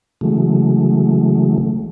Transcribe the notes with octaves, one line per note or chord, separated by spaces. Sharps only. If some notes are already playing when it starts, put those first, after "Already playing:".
C#3 E3 F#3 G#3 A3